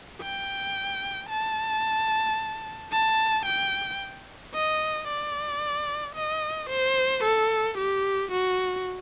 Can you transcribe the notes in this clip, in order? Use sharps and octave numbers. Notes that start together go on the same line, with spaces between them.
G5
A5
A5
G5
D#5
D5
D#5
C5
A4
G4
F#4